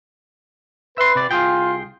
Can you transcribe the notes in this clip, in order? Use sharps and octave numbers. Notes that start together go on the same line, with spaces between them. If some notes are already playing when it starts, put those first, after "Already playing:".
B4 E5 C6
C3 D5
C2 F4 G#4 G5